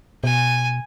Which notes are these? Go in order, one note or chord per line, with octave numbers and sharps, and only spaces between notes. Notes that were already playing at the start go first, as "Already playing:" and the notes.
B2 G#5